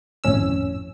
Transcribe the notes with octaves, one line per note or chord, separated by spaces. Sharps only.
G#1 F2 A2 C#4 E6